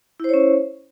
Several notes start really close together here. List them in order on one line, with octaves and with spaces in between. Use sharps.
E4 C5 C#5 C#4